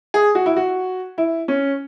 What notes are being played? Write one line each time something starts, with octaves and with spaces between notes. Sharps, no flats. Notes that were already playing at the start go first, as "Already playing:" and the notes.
G#4
F#4
E4
F#4
E4
C#4